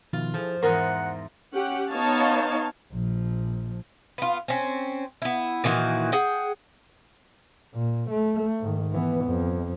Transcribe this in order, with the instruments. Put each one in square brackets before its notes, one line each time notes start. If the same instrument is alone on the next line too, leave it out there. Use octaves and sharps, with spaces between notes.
[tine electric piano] B2 D#3 F3 [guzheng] F4
[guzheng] F3 [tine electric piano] E4 G#4 A4
[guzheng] E2 G#2 [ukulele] A#4 [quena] F#5 [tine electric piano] A#5 C6
[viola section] C#4 G4 F#5
B3 D#4 C#5 D#5 F5 A5
[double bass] A#1 F3
[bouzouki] B3 F4
C4 C#4
B3 E4
A#2 D#3 E3 F#4
G#4 F#5 G5
[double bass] A#2
A3
G#2 D#3
E3 B3
F2